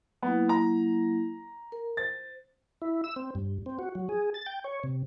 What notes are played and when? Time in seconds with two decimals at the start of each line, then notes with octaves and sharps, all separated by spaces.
0.23 F#3 A#3 B3 E4
0.49 A#5
1.72 A#4
1.97 C5 A6
2.82 E4
3.04 E6
3.16 C4
3.35 G2
3.66 C4
3.79 F#4
3.95 F#3
4.09 G#4
4.34 A6
4.46 G5
4.64 C#5
4.83 C3